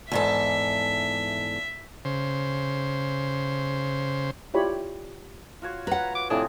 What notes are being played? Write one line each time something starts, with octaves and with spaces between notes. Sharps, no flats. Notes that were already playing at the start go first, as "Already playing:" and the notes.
E2 G#2 A4 E5
C#3 C5
E4 F4 G4 C#5 D5 B5
F4 F#4 C#5
B4 F#5 A#5
D6
A2 C3 F3 D4 G#4